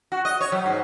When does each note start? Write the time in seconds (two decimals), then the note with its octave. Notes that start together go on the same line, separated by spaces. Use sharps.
0.12 F#4
0.25 D#5
0.41 C#5
0.52 F#3
0.66 G#2